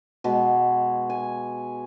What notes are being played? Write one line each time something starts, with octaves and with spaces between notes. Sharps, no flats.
B2 G#3
G#5